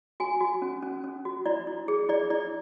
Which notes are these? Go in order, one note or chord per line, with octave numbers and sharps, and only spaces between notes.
F#4 G#5
F#4
C#4
C#4
C#4
F#4
E4 D5
E4
G#4
E4 D5
E4 D5